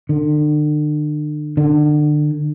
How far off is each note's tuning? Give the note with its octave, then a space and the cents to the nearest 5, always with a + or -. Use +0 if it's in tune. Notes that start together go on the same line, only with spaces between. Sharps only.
D3 +40
D3 +30